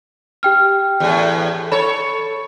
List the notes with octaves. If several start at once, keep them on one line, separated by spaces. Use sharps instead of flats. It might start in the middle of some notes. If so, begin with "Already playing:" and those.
G4 G5 F6
E2 A2
A4 C#5 B5